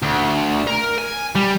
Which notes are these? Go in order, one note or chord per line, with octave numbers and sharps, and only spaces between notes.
D2
A#4
G#5
G3